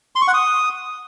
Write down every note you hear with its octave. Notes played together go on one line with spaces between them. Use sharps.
C6
C#6
F#5
D#6